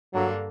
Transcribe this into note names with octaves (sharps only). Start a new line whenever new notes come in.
G2 D3 F#3 A#3 D4